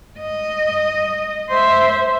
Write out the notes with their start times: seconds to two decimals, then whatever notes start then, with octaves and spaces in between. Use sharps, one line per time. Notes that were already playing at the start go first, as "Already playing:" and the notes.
0.19 D#5
1.49 C5 E5